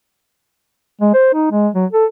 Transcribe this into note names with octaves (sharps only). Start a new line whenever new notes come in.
G#3
C5
D#4
G#3
F#3
A4